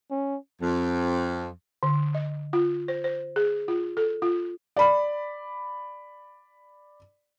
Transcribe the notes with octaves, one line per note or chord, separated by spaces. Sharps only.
C#4
F2
D3
D#5
F4
C5
C5
G#4
F4
A4
F4
D5 B5